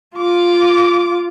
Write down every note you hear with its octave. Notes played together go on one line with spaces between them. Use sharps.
F4 D6